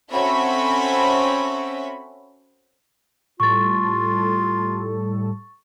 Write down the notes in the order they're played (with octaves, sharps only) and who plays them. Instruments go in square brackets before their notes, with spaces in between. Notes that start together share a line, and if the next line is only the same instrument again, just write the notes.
[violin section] C4 C#4 F#4 A4 E5 B5
[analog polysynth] A2 G3 A4 [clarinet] F4 [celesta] C#6 A6